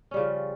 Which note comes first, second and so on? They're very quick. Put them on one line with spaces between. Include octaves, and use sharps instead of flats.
C#4 G3 C#3 F3